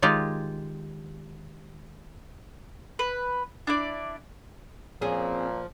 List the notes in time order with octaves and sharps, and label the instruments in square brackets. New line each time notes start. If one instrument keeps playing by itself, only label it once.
[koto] D#3 G#3 F4 G4 G#4
[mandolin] B4
D4 E4 D5
[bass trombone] A#2 [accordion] F3 [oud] C4 C#4 G#4